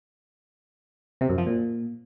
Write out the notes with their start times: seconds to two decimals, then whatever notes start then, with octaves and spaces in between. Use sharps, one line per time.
1.21 C3
1.29 F#2
1.38 F3
1.46 A#2